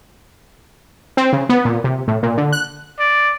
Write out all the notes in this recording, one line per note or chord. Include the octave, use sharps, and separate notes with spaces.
C4
C#3
B3
A#2
C3
A2
A#2
D3
F#6
D5